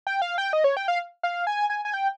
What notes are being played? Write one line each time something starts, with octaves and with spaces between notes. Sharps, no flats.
G5
F5
G5
D#5
C#5
G5
F5
F5
G#5
G#5
G#5
G5